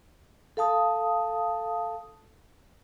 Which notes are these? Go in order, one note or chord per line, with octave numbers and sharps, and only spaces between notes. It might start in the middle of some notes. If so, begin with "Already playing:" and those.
A4 F5 A5 D#6